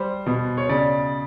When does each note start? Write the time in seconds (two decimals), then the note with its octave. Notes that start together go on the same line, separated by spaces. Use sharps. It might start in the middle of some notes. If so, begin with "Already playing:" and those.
Already playing: G3 C5
0.26 B2
0.57 C#5
0.69 C#3 D5